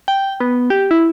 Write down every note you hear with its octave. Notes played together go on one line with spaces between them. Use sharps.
G5
B3
G4
E4